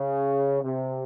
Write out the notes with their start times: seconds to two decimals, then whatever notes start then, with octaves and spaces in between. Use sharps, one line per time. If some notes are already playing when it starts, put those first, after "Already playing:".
Already playing: C#3
0.62 C3